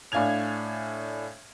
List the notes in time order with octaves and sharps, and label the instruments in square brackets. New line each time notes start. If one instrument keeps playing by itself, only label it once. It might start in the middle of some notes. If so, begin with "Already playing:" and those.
[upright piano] A2 D4 F5 G#5 G#6 F7